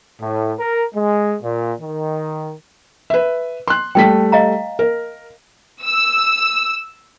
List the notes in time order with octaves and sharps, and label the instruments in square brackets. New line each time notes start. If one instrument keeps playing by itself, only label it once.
[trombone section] A2
A#4
G#3
A#2
D#3
[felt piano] B4 E5
C6 F#6
[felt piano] G3 A3 B6 [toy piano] G5
[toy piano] D#5 F5 A#5
[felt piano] A#4
[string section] E6